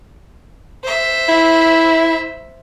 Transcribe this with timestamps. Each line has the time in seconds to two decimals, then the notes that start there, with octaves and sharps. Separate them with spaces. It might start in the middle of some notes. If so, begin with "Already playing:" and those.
0.84 C5 E5
1.29 E4